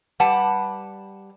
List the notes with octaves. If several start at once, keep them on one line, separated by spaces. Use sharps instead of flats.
G3 G4 B4 F#5 A5